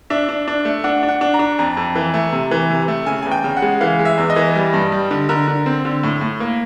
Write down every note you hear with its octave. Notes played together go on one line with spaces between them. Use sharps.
D4 E5
D4
D4
A3
D4 F#5
D4
F#5
D4
A#5
D4
F2 A#5
F2
E3
A3
C3
E3
C3
A3
C#3 G#5
E2 G#5
G5
C#3
F#5
G#3
E3 F5
G#3
E5
E2
D#5
E3
G3
G2
G3
D3
D3 A#4
D3
C4
D3
A2
A2
A#3